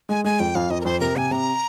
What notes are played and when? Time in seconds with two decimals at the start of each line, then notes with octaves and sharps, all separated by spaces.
0.09 G#3 G#5
0.24 G#3 G#5
0.40 F2 G5
0.55 F2 F5
0.70 F2 D#5
0.81 A#4
0.85 F2 C5
1.00 C3 A#4
1.16 C3 G#5
1.31 C3 A#5